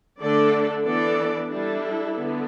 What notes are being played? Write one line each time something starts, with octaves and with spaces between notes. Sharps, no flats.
D3 A3 D4 A4 D5
E3 B3 D4 A4 D5
G3 D4 E4 A4
D3 B3 D4